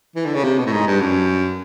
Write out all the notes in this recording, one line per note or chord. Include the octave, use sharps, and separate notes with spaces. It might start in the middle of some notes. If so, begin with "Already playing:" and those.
E3
D3
C#3
C3
B2
A2
G#2
G2
F#2